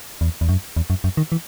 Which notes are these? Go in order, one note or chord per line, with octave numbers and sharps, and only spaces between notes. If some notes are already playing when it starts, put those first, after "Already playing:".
E2
E2
F#2
E2
F#2
F#2
D#3
E3